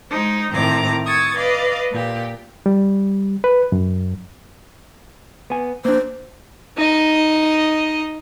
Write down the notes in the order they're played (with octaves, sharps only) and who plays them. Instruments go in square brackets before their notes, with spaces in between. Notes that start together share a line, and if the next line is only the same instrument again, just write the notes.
[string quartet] G#3 D#4 C5
A2 D#3 C4 A#5 D6
C#6 D#6 E6 G#6 A6
B4 D5 D#5 F5
A#2 G4
[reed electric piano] G3
B4
F#2
[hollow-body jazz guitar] B3 G#5
[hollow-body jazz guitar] A#3 D4 [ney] C5
[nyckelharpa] D#4 D#5